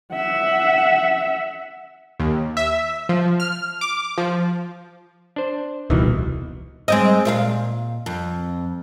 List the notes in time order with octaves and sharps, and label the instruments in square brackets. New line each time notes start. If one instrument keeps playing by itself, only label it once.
[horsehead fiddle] E5 F#5
[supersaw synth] D#2
E5
F3
F6
D6
F3
[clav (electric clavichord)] D4 C5
[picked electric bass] D#1 C2 B2 [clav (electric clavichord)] D#3 E3
[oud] G#3 C4 D#5
A#2 E5 F5
F2